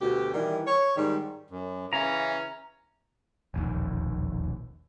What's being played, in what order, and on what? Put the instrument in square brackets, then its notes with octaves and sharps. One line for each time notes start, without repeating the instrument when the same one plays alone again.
[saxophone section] D2 B2 G4
D#3 E3 G3
C#5
G#2 D#3 G3
[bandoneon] F#2
[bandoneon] C#3 [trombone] E3 [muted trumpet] C#4 [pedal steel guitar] A#5
[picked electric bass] E1 A#1 D#2